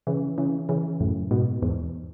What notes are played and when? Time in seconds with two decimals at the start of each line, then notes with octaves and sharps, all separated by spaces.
0.07 C#3 E3
0.38 C#3 E3
0.69 C#3 E3
1.00 F#2 A2
1.31 G#2 B2
1.62 E2 G#2